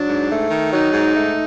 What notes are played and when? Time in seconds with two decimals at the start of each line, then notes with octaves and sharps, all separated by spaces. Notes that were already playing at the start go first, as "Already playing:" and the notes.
Already playing: F#3 D4
0.08 G#2
0.29 A3
0.50 D#3
0.71 F#3 D#4
0.92 G#2
1.14 A3